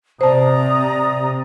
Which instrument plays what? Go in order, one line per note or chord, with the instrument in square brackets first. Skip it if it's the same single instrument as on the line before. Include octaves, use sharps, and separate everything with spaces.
[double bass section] C3 [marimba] C5 A5 [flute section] D5 A#5 D#6